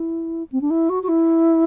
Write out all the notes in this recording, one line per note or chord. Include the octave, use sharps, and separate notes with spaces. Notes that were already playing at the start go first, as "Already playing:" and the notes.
Already playing: E4
C4
D4
E4
F#4
F#4
E4